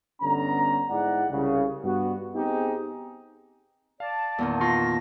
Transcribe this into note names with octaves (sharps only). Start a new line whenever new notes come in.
G1 D3 B3 C#4 A#5
G#2 G#3 E4 D5 F#5
C2 C#3
G2 B3 F#4
B3 C4 D#4 G4 G#4
D5 F5 A5
E2 A#2 D#3
F4 C6 C#6 A#6